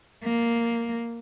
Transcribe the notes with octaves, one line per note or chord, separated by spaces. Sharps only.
A#3